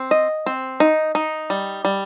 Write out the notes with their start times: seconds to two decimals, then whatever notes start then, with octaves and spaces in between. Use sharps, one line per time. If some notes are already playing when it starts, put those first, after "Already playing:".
Already playing: C4
0.11 D#5
0.46 C4
0.80 D#4
1.15 D#4
1.50 G3
1.85 G3